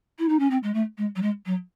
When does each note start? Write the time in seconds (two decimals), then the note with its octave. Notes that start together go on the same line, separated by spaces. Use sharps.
0.19 E4
0.29 D#4
0.39 C#4
0.50 C4
0.63 G#3
0.74 A3
0.98 G#3
1.16 F#3
1.22 G#3
1.46 F#3